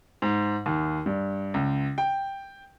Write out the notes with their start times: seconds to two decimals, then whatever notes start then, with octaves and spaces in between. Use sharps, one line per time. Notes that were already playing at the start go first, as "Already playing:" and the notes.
0.22 G#2
0.66 D#2
1.06 G2
1.54 C#2
1.98 G5